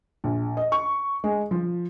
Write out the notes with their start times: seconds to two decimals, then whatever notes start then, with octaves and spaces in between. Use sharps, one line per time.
0.24 A#1
0.57 D#5
0.72 C#6
1.24 G#3
1.51 F3